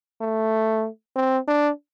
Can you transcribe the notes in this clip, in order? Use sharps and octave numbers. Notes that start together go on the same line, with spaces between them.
A3
C4
D4